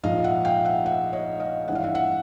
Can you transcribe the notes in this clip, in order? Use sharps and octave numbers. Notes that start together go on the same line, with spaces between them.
A#1 G#2 F3 D#5 F5
E5 F#5
F5 G5
E5 F#5
E5 F#5
C#5 D#5
D#5 F5
G#1 G2 E3 F#5
F5
E5 F#5
E5 F#5